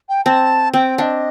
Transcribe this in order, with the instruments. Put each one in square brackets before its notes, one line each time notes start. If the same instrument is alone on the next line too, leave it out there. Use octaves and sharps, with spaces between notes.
[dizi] G5
[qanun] C4 [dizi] A5
[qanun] C4 [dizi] G5
[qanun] D4 [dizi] D#5 F#5